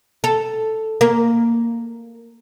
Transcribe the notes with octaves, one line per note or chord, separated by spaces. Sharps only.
A4
A#3